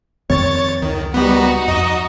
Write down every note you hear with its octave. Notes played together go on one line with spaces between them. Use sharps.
F2 D#3 C4 C#5 A6
C#2 D#3
G3 B3 D#4 F#4
F2 D#5